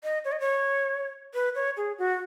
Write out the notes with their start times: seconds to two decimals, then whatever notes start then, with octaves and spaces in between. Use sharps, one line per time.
0.04 D#5
0.25 C#5
0.32 D#5
0.40 C#5
1.34 B4
1.55 C#5
1.77 G#4
1.99 F#4